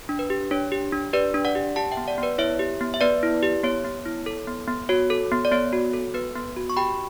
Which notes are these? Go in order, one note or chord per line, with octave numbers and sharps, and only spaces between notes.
D4
B4
G4
D4 C#5
G4
D4
G4 B4 D5
D4
D5 F#5
G4
G4 F#5 A5
E5 G5
B3
D5 F#5
B3 B4 D5
E4 C#5 E5
G4
B3
E5
B3 B4 D5
E4
G4
B3 C#5
B3
E4
A4
B3
B3
F#4 C#5
A4
B3
D5
B3 C#5
F#4
A4
B3 B4
B3
F#4
C#6
G4 G5 B5